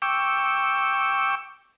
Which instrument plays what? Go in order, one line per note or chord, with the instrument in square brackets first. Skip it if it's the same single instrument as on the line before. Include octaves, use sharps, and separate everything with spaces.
[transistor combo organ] G5 C#6 D6 E6